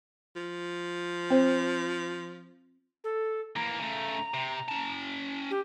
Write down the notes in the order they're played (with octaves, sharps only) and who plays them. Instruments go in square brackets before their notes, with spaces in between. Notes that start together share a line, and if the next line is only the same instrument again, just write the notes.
[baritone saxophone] F3
[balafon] C4 C5
[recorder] A4
[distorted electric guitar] E3 A#3 [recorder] A#5
[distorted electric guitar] C#3 A3
C3
C#4 A5
[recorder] G4